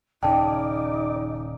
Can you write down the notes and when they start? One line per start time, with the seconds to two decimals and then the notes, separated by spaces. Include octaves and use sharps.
0.23 D#1 C#3 D#4 D5 G5 A5